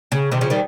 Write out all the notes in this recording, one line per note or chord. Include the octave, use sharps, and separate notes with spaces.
C#3
C3 D#3
C#3 F3
D#3 G3